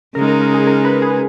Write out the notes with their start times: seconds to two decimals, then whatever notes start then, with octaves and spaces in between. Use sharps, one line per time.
0.15 C#3 G#3 D#4 A#4
0.28 A#4
0.41 A#4
0.54 G#4
0.67 A#4
0.85 B4
1.02 G#4